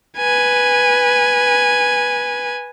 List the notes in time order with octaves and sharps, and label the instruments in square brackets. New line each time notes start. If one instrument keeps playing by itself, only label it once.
[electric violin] B4 G#5